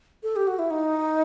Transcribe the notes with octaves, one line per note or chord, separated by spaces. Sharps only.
A4
G4
F#4
E4
D#4